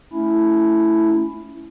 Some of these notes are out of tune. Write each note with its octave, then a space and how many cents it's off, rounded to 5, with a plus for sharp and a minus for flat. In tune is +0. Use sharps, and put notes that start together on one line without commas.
A3 +0 C#4 +20 E4 +0